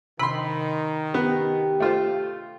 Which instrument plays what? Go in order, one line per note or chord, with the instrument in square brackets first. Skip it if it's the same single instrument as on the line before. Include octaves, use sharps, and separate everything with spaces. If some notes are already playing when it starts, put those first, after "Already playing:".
[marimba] C3 [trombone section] D#3 [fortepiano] B5 C6
[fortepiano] B3 [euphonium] G4
[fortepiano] A3 F4 C5